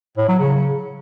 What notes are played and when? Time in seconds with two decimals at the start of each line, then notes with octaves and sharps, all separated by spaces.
0.17 A2
0.28 F#3
0.39 C#3